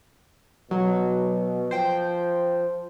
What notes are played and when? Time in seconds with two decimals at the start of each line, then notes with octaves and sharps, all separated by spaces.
0.71 B2 F#3
1.71 F3 C5 G5